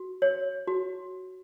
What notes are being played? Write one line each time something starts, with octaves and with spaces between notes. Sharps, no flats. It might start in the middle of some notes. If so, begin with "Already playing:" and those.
Already playing: F#4
C#5
F#4